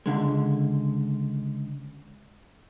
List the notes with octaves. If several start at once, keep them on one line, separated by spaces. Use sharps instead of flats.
C#2 D3 G#3